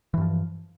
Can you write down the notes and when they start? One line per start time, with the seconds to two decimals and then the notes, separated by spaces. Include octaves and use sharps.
0.14 E3
0.18 G2
0.21 F3